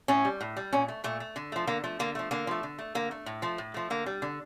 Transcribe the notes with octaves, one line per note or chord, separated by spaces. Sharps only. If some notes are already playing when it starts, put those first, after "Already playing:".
A2 C#4
G3
A2
G3
A#2 C#4
A3
A#2 A3
A3
D3
F3 A3
D3 A#3
F3 A3
D3 A#3
F3 A3
D3 A#3
F3 A3
D3
A3
D3 A#3
A3
A2
F3 A3
A2
F3 A3
D3 A#3
G3
D3